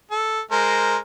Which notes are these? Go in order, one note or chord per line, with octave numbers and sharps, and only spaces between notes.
A4
G#3 A#4 C5